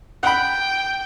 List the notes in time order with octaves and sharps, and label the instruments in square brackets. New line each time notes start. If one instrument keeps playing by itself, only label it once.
[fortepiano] F#5 B5 [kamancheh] G5